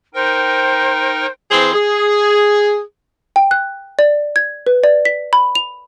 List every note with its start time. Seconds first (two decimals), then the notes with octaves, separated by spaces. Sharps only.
0.14 D#4 A#4 C5 G5
1.51 E3 C4 G#4 C5
1.74 G#4
3.36 G5
3.51 F#6
3.99 D5
4.36 G#6
4.67 B4
4.84 D5
5.05 B6
5.33 B5
5.55 F7